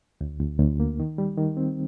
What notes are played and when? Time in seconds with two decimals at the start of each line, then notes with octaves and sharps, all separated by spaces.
0.21 D2
0.40 D2
0.60 D2
0.80 A#3
1.00 D#3
1.18 G3
1.38 D#3
1.57 C4